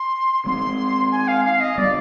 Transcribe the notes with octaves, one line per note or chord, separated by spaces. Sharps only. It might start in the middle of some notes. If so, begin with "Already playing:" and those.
Already playing: C6
G#3 C4 C6
G#5
F5
F5
D#5
G3 B3 D5